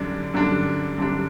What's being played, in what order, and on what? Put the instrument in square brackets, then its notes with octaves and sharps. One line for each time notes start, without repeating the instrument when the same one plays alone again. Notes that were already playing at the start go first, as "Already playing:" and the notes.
Already playing: [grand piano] F#2 D3 G3 D4
F#2 D3 G3 D4
F#2 D3 G3 D4